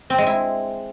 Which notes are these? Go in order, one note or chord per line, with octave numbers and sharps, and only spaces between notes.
C4
G#3
E4